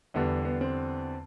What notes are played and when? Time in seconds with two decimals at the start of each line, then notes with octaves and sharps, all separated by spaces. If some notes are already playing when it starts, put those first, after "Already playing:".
0.14 E2 D3 G3 B3
0.45 B3
0.61 C4